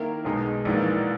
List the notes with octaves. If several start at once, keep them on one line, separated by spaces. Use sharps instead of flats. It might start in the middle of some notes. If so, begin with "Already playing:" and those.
Already playing: D#3 A#3 E4 A#4
B1 B2 G#3 D#4
A#1 G#2 E3 A#3